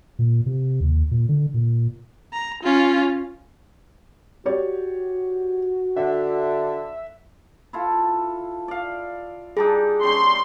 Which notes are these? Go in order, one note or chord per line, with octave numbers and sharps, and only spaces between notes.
A#2
C3
D#2
A#2
D3
A#2
A#5
C#4 F4
F#4 G4 C#5 D5
D3 E5 F#5
E4 F4 A4
D5 F5
G3 D4 D#4 G#4
G3 C#4 C6